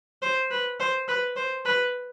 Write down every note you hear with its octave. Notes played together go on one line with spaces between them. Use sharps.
C5
B4
C5
B4
C5
B4